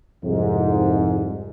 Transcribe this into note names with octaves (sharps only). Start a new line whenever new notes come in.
C2 F2 G#2